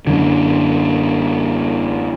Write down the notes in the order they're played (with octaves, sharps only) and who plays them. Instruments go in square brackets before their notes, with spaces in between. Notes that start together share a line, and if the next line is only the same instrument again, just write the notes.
[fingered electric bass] F#2 D3